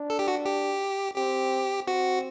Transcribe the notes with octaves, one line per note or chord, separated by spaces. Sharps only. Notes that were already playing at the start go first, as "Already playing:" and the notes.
Already playing: D4
A4
G4
F#4
G4
C4 G4
C4 F#4